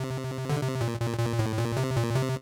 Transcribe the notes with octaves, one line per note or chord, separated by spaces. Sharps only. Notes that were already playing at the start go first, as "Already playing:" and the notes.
Already playing: C3
D3
C3
A#2
A#2
A#2
A2
A#2
C3
A#2
C3